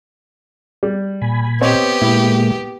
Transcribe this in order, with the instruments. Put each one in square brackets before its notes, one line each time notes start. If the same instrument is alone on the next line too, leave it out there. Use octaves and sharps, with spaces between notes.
[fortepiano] G3
[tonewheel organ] A#2 G#5 B5
[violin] B3 G4 [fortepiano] C4 C#5 D#5
[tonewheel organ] A#2 G#3 A#3 [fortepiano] E4